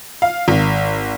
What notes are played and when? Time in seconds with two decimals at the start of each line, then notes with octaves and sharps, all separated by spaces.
0.22 F5
0.48 G#1